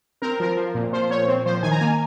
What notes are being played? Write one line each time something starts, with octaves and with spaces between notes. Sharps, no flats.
C4 A#4
F3 A#4
F3
A#2
F3 C5
A#2 C#5
C4
F3 C5
D#3 G#5
A#5
A#3 G#5